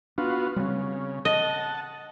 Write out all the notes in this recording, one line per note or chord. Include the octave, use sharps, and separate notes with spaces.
B3 D4 F4 F#4
C#3 G3 C4
D#5 F#5 A5